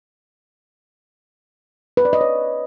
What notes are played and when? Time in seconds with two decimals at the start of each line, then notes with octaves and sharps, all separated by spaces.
1.97 B4
2.05 D5
2.13 D#5
2.21 C#5